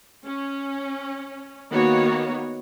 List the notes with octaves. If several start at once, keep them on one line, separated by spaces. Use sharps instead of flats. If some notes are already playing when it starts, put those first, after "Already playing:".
C#4
D#3 A#3 B3 F#4 C#5